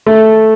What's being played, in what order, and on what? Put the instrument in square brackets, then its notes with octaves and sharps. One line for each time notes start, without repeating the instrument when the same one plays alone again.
[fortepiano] A3